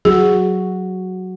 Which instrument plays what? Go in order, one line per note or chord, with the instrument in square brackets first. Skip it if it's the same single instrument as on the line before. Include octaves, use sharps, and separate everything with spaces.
[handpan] F#3 F#4 [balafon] G#4